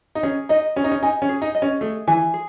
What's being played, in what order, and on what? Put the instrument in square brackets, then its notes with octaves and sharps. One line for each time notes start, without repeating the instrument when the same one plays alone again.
[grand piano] D#4
[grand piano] C#4 [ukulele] G#4
[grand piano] D#4 [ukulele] D#5
[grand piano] C#4 [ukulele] G#4
[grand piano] D#4
C#4
[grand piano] D#4 [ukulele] G#5
[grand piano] C#4
[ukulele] G#4
[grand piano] D#4
[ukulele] D#5
[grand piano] C#4
[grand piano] A3 [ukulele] G#4
[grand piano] E3 [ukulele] G#5
[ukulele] G#4